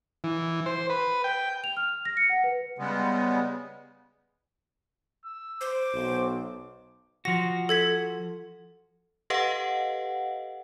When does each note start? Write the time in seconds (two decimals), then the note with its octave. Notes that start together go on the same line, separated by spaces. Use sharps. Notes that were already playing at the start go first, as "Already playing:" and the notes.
0.24 E3
0.66 C5
0.90 B4
1.24 G5
1.64 F7
1.77 F6
2.05 A#6
2.17 C#7
2.30 F#5
2.44 B4
2.78 C#3 G3 G#3 B3
5.24 E6
5.61 C5 D6
5.94 B1
7.25 F3 F#4 A#6
7.69 A4 G#6 B6
9.30 G4 A4 B4 D#5 F5 F#5